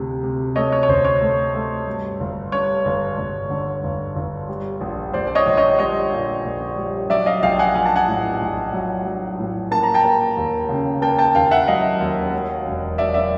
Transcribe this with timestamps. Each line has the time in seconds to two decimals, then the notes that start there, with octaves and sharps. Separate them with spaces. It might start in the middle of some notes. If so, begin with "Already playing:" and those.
Already playing: D2 C3
0.23 C3
0.56 A3 C#5 D#5
0.72 C#5
0.83 C#5
0.89 D2 C5
1.05 C#5
1.21 A3
1.54 A3
1.87 G2
2.20 G1
2.52 G2 C#5
2.85 G1
3.18 G1
3.50 D3
3.84 G1
4.16 G1
4.49 G3
4.81 A#1
5.13 A#1 C5 D5
5.27 D5
5.35 C#5 D#5
5.46 A#1
5.57 C#5 D#5
5.79 G3 C#5 D#5
6.12 A#2
6.45 A#1
6.78 G3
7.10 F#3 D5 E5
7.26 D#5 F5
7.42 A#1 F5 G5
7.59 F#5 G#5
7.75 A#1 G#5
7.86 A5
7.96 F#5 G#5
8.08 A2
8.41 A#1
8.73 F#3
9.06 F#3
9.39 A2
9.71 A#3 A5
9.83 A#5
9.94 G5 A5
10.04 A#3
10.37 D#2
10.69 C#3
11.02 A#3 G5 A5
11.19 G5 A5
11.35 D#2 F5 G5
11.51 E5 F#5
11.68 F#3 D#5 F5
12.01 D#2
12.33 F#3
12.66 E1
12.98 F#3 D5 E5
13.14 D5 E5